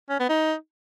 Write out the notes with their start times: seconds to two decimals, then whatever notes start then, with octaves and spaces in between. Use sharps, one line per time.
0.09 C#4
0.19 B3
0.29 D#4